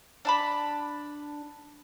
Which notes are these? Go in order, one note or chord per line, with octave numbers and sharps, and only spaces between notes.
D4 A5 B5